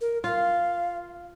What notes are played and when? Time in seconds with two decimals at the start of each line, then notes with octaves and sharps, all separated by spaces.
0.01 A#4
0.24 F4 F5